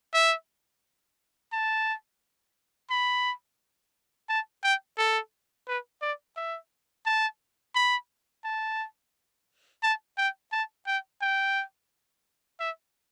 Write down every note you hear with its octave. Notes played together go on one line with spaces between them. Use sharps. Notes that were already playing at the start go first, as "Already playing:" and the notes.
E5
A5
B5
A5
G5
A4
B4
D5
E5
A5
B5
A5
A5
G5
A5
G5
G5
E5